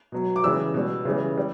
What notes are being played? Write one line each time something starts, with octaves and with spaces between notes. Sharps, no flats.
B2 F#3
D6
C#3 E3 G3 E6
B2 G3
C#3 E3 G3
G3